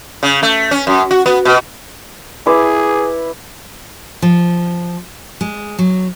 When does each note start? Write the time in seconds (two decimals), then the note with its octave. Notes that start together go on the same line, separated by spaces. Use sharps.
0.23 C#3
0.43 A3
0.71 C#4
0.87 F#2
1.11 F#4
1.26 B3
1.45 B2
2.46 E4 G#4 B4 D6
4.22 F3
5.41 G#3
5.79 F#3